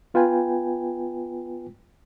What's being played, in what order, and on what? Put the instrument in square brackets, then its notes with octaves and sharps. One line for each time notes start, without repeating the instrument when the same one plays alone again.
[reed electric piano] B3 F4 B4 G5 G#5